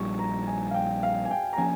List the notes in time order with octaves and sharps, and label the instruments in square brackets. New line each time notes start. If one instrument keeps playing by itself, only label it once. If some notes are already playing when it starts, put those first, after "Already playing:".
Already playing: [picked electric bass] A#1 A#2 G3 [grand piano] C#6
[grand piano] A#5
G#5
F5
G5
F5
G#5
G5
A#5
[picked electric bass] F3 A#3 C#4 [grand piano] G#5